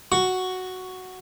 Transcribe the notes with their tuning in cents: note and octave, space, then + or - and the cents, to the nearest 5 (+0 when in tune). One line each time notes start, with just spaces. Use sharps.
F#4 +0 C#6 +5